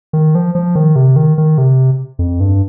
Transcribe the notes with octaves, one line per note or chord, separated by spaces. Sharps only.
D#3
F3
F3
D#3
C3
D#3
D#3
C3
F2
G2